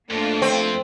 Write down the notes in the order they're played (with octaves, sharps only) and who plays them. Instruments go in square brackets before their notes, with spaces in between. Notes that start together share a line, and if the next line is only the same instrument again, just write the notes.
[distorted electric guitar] F2 [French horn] A3 [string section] A#3 D4 F4
[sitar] C4